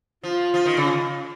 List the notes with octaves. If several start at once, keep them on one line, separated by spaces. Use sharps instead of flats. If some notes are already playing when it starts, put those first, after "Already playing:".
F3 F4
F3
D#3
C#3
F4